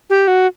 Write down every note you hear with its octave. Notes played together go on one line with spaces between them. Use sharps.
G4
F#4